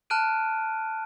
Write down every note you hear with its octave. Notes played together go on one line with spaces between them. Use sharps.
A5 F6 F#6 D7 D#7